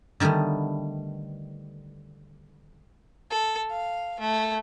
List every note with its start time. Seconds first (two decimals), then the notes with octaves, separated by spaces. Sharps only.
0.20 D3 D#3 G3 A3 B3
3.30 A4
3.70 F5
4.20 A3